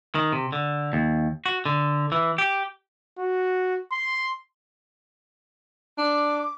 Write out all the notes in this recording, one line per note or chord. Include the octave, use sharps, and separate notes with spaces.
D#3
C3
D3
D#2
F#4
D3
E3
G4
F#4
C6
D4 D6